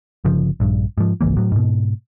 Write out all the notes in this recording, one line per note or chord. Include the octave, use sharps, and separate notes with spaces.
G1 C#3 F3
A#1 G2
G#2 F3
G#1 C#2 E3 A#3
A2 F#3
G#2 B2